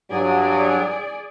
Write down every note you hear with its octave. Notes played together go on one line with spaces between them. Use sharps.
G2 F#3 G#4 D5